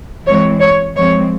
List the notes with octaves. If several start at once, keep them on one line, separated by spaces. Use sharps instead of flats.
E3 G#3 C4 C#5
C#5
F3 G#3 C4 C#5